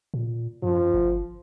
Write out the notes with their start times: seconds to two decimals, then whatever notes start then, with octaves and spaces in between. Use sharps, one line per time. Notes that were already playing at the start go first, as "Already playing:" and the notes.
0.14 A#2
0.63 F#2 F3
0.94 G1